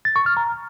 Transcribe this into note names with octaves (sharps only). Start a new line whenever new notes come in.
A6
C#6
F6
A#5